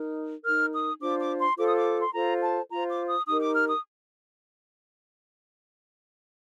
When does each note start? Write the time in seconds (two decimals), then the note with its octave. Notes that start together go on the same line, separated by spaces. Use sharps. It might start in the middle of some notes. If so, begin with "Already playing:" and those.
Already playing: D#4 A#4
0.44 D#4 A#4 F6
0.72 D#6
1.00 D4 F4 C5 D6
1.20 D6
1.39 C6
1.57 F4 A4 C5 D6
1.67 D#6
1.76 D6
2.01 C6
2.14 F4 A4 C5 A#5
2.41 A5
2.70 F4 C5 A#5
2.89 D6
3.08 D#6
3.27 D#4 G4 A#4 D#6
3.40 D6
3.55 F6
3.68 D#6